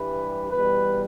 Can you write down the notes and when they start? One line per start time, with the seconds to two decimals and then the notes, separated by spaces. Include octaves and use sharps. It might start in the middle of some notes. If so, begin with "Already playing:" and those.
Already playing: G2 E3 G3 B4
0.51 E2 B2 G3 B4